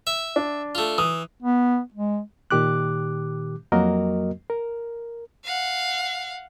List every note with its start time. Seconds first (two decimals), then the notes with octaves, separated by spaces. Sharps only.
0.07 E5
0.36 D4
0.75 A3 F4
0.98 E3 D#6
1.43 B3
1.94 G#3
2.51 A#2 D#3 G4 D6 F#6
3.72 F2 F#3 A#3 F#4 A#4 D#5
4.50 A#4
5.44 F5 F#5